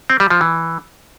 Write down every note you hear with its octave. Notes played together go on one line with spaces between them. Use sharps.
C4
G3
F3
E3